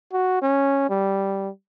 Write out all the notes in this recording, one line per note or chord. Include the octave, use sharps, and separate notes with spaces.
F#4
C#4
G3